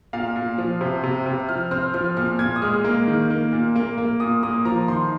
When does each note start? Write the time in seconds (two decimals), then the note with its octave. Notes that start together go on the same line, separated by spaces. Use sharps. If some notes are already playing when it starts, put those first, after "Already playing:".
0.13 A#2 F5
0.36 A#2
0.58 F3
0.81 C3
1.04 C3
1.26 C3
1.49 F3 F6
1.71 C4 F6
1.94 F3 F6
2.17 A#2 F6
2.39 A#2 G#6
2.56 D#6
2.62 G#3 F6
2.84 A#3
3.07 D#3
3.30 A#3
3.53 A#2
3.76 A#3
3.98 A#3
4.20 A#2 D#6
4.43 A#3 D#6
4.65 F3 A#5
4.88 D#3 C6